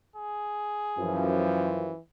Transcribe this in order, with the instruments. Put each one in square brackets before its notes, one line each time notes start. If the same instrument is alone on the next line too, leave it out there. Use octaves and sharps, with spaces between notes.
[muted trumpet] G#4
[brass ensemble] F#2 F3 [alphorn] E3